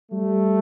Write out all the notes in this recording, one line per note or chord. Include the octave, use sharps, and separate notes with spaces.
G3 A3